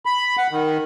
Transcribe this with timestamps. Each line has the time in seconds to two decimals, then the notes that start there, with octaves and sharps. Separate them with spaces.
0.06 B5
0.38 F#5
0.51 D#3